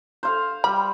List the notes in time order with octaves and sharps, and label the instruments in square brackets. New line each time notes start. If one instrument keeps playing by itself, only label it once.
[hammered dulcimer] C5 F5
[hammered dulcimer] G3 [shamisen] B5